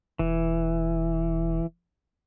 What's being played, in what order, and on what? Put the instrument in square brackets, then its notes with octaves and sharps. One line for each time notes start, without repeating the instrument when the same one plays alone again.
[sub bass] E1 [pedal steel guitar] E3